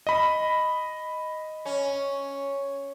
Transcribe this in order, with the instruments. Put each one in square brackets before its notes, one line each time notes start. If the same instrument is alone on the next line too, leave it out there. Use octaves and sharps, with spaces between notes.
[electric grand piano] D#5 B5
[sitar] C#4